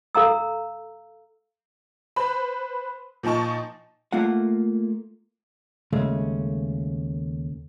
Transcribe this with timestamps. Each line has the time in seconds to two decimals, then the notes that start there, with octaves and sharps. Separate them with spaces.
0.15 A4 F5 A#5 E6
2.16 B4 C5 B5
3.23 A#2 F3 D#4 A5 C#6
4.13 A3 A#3 F4 F#5
5.93 D#2 C#3 G#3 A3 C#4